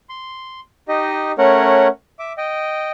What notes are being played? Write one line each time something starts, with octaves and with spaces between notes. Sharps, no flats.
C6
D#4 G4 D#5
A3 C#4 A#4 C#5 F#5
E5 D6
D#5 G5